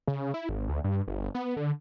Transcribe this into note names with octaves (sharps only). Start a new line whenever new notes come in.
C#3
E4
G#1
D2
G2
G1
B3
D3